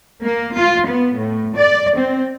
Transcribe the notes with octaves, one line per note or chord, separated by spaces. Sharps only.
A#3
F4
B3
A2
D5
C4